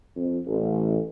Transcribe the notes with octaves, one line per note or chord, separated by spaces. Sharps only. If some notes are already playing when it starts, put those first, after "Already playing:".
F2
A1